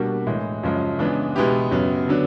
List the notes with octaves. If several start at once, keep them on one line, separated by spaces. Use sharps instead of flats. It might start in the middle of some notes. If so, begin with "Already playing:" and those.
Already playing: B2 G3 A#3 D4 F#4
A2 E3 G#3
F#2 C#3 F3 G#3
C#3 E3 G#3 B3 D4
B2 G#3 B3 E4 G4
F#2 C#3 F#3 B3
D3 F#3 B3 D4